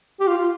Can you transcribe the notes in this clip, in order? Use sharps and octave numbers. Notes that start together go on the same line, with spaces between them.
G4
F4
F4